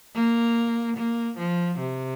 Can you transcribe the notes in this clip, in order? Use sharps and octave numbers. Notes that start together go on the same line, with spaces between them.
A#3
A#3
F3
C3